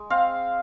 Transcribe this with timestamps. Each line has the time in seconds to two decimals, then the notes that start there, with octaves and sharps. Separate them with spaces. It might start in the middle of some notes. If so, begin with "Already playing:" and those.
Already playing: G#3
0.10 C4 F5